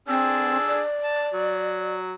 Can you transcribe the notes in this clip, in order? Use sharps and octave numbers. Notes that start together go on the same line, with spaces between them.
C4 D4 G#4 E6
D5
A5
F#3